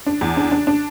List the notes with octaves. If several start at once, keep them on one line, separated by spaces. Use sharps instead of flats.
D4
E2
D4
D4
D4